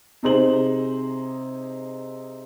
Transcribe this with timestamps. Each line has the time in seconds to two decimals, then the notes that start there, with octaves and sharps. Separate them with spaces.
0.23 C3 D#4 G#4 C5 F#7